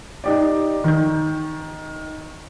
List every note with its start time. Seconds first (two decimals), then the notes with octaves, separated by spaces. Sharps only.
0.24 D#4 G4 D5
0.84 D#3 G6